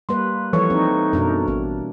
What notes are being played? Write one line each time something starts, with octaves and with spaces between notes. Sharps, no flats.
G3 A#3 B4 C6
E3 F3 G3 A4 B4 C#5 C#6
C4 D#4
F#2 B2 D4 A#4
A1 D4